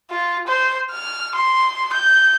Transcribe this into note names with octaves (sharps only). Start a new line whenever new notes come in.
F4
C5
F6
C6
G6